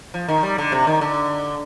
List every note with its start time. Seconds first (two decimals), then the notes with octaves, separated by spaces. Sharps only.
0.14 F3
0.28 D#3
0.43 G3
0.58 D3
0.72 C3
0.87 D#3
1.01 D3